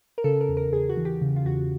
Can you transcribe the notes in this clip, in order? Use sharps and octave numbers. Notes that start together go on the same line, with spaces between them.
A#4
C#3 A4
A#4
E2
A#4
E2 G#4
F#4
E3
G4
C#3
F4
E2 F#4